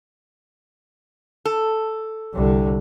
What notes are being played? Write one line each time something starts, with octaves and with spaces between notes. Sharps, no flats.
A4
C2 D3